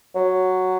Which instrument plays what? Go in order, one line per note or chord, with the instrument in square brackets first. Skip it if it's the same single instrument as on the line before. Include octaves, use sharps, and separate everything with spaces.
[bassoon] F#3